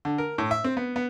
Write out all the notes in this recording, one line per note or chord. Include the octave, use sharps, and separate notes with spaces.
D3
A#4
A2
E5
C4
B3
B3